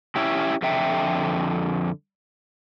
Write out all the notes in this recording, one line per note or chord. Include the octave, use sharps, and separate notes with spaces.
C#4 E4 G4
F2 D3 E5 G5